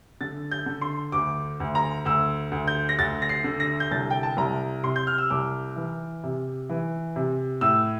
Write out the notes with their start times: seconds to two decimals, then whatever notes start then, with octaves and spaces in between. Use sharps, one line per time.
0.21 D3 A6
0.51 G6
0.66 D3
0.81 C6
1.12 D2 D6
1.60 D2
1.75 A#5
2.05 D2 E6
2.51 D2
2.68 G6
2.89 A#6
2.99 D2 A6
3.22 A#6
3.29 C7
3.44 D3
3.60 A#6
3.80 G6
3.91 C2 A6
4.10 G5
4.23 A5
4.37 C2 A#5
4.83 C3 C6
4.96 G6
5.07 F6
5.18 E6
5.30 C2 D6
5.76 E3
6.23 C3
6.69 E3
7.16 C3
7.61 A2 E6